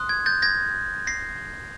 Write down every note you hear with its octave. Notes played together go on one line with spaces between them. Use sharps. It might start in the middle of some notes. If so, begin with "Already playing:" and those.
Already playing: C6 D#6 F#6
G#6
G6 A6
G#6 A#6
A#6 C7